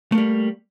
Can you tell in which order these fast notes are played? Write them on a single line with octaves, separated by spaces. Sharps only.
A3 A#3 G3